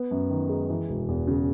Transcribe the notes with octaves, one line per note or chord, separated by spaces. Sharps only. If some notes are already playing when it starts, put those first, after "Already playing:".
Already playing: B3
F#2
D#3
G#3
E3
E1
E2
C#3